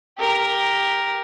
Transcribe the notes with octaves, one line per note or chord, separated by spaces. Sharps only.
G4 A#4